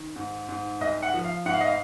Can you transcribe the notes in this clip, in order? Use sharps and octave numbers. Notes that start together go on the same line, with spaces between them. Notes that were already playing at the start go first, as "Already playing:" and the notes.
Already playing: D#3
G#2
G#2
C2 D#5
F#5
F3
F5
G#2 F#5
F5
D#5
F5